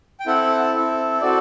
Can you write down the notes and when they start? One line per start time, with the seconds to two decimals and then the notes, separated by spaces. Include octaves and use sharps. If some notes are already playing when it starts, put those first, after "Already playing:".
0.20 G5
0.26 C4 E4 A4 F#5
0.74 C4 E4 A4
1.21 C4 F#4 A4 D5